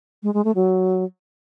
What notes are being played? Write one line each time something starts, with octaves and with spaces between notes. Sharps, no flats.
G#3
G#3
A3
F#3